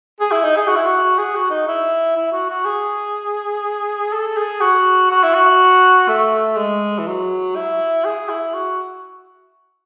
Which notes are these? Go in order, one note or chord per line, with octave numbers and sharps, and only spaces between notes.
G#4
E4
D#4
G#4
F#4
E4
F#4
G#4
F#4
D#4
E4
E4
F#4
F#4
G#4
A4
G#4
F#4
F#4
E4
F#4
A3
G#3
E3
F#3
E4
G#4
E4
F#4